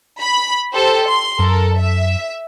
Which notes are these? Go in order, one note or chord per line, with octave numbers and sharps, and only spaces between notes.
B5
G4 A4 C5
C6
F#2 A4 A#4
E5